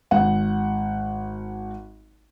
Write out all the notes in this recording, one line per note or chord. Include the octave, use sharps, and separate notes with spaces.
G#1 F#5